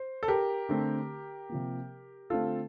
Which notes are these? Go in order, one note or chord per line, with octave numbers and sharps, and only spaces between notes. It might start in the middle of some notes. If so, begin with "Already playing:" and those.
Already playing: C5
A4
G4 A#4
D3 A3 C4
C3 F3 A#3
D3 A3 C4 F4 A4